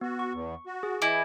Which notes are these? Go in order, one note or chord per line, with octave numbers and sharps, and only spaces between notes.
B3 F#4
C#6
E2
F#4
G#4
E3 E4 D#5 G#5 D6